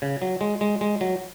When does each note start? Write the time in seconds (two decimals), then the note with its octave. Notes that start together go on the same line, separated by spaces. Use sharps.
0.02 C#3
0.22 F#3
0.41 G#3
0.61 G#3
0.81 G#3
1.01 F#3